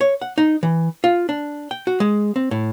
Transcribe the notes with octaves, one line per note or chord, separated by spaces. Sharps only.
C#5
F#5
D#4
E3
F4
D4
G5
F#4
G#3
C4
A2